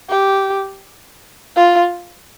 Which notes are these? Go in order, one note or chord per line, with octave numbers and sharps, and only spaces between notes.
G4
F4